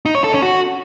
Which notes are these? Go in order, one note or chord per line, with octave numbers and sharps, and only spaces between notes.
D#4
C#5
A4
C#4
F#4